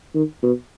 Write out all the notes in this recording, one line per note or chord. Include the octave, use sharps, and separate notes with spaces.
D#3
B2